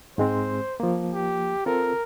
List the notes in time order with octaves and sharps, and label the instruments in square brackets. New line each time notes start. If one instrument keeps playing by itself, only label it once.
[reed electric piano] G#2 G#3 C4 [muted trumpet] C5
[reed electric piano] F3 A#3
[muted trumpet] G4
[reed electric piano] C4 F4 A4 [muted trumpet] A#4